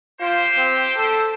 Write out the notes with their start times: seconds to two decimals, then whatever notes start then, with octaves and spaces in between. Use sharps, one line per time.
0.21 F4 G4 C5
0.58 C4
0.96 A4